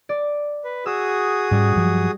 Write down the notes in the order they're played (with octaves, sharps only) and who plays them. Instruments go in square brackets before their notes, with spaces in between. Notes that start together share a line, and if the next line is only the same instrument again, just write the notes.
[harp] D5
[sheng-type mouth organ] B4
[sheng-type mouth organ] F#4 G#4 D#6 [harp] E6
[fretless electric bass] G#2 C#4 [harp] G3
[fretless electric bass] G2 F3 F#3